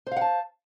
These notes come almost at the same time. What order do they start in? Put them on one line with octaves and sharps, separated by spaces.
C5 F5 F#5 A5